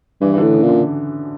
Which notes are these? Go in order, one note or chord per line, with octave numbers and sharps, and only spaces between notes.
G2 E3
E3
A2 D3
C#3
A#2
D3